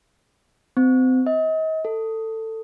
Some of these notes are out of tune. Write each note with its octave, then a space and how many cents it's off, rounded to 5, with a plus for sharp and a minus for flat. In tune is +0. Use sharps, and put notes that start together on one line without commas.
C4 -30
D#5 +35
A4 +20